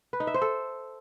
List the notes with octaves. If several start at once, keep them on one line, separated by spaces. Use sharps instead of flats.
B4
D#4
E5
C5
A4